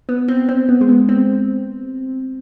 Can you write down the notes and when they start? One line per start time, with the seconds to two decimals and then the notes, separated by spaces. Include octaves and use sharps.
0.09 B3
0.28 C4
0.49 C4
0.69 B3
0.81 G#3
0.89 B3
1.09 C4